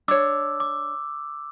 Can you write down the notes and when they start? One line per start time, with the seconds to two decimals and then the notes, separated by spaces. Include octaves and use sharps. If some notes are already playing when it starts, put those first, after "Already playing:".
0.08 D4 C#5 D6 E6
0.60 D6